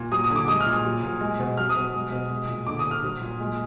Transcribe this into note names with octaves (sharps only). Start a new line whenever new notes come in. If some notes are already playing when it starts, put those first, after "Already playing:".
Already playing: A#2
F#3 D#6
D#6
D3
D6
G#3 D#6
F6
A#2
F#3
A#2
G#3
B2
F#3 F6
D#6
B2
G#3
B2
G#3
A#2
D3 D6
D#6
D3
F6
F#3
A#2
G#3